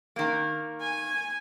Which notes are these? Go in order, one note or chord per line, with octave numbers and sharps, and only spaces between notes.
D#3 A#3
G#5